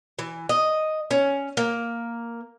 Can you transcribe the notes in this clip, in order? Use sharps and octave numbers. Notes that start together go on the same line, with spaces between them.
E3
D#5
C#4
A#3